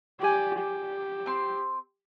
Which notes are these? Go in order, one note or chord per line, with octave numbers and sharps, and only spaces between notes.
G4 D5 G#5
G4
C4 C6